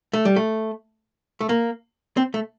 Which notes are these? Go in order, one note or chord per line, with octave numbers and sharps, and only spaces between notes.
A3
G3
A3
A3
A#3
C4
A3